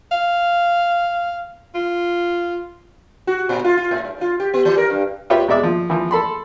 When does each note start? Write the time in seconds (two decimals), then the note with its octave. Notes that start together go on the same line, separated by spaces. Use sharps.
0.12 F5
1.75 F4
3.27 F#4
3.49 A#2
3.64 F4
3.77 F4
3.91 A2
4.05 G2
4.21 F4
4.40 G4
4.54 B3
4.65 E3
4.78 A#4
4.90 G2
5.30 F4 G4 B4 C#5 E5
5.48 B2 G#3 D5 E5 D6
5.63 F3
5.90 E3 F3
6.11 A4 B5 C6